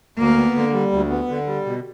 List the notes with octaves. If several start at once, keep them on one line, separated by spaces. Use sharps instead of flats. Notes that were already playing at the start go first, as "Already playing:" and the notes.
D2 A#3
B3
D3
G3
D2
B3
D3
G3
B2